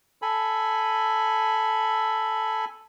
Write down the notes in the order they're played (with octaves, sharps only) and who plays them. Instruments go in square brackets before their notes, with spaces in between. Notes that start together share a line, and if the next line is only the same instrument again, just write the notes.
[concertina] A4 G#5 B5